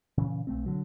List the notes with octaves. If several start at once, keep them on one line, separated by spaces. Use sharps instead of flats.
A#2 C#3 E3 C#4
B1 A3 C4
D3 F#3